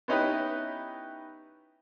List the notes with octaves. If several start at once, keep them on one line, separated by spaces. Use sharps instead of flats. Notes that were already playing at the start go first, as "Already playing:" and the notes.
B3 C#4 D#4 E4 G4 B4